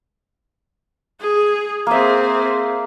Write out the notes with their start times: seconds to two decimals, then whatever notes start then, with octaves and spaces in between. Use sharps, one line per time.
1.21 G#4
1.87 A#3 C4 G#4 E5